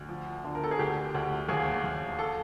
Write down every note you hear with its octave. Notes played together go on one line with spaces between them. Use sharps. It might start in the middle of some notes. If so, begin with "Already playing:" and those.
Already playing: D2
F3
D3
A#4
A4
G#4
D2 G4
D2
D#2 G#4
D#2
A4